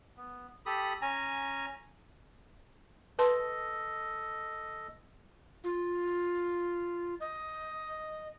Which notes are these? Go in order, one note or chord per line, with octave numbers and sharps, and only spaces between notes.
B3
G4 A4 B5 D#6
C#4 G#5 A#5
A4 B4 D#5 A5 C6
F4
D#5